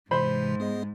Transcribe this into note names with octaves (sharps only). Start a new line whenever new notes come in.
G#2 C3 E3 C5 B5
B3 G#4 D#5